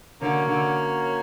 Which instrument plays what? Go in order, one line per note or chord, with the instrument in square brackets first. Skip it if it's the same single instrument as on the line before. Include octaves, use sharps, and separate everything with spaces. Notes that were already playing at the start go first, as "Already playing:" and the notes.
[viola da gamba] D3 [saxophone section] A#3 C#4 F#4 C#5
[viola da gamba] D3